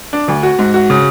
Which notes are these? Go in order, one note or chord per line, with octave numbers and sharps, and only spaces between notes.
D4
D2
F#4
G#2
F#4
C#3